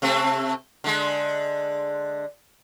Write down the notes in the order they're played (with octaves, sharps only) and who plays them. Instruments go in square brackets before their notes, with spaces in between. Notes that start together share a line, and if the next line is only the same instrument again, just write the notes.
[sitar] C3 A3 C4
D3 G#3